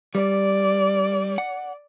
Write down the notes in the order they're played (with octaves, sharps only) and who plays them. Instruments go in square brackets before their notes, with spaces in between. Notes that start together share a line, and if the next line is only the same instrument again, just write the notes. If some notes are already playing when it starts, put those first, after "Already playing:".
[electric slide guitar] G3 [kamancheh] D5
[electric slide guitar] F#5